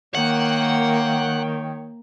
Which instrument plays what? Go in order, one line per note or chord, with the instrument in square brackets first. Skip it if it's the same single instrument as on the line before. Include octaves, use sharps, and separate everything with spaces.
[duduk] D#3 [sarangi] A#3 [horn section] C#5 G5 [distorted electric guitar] F#5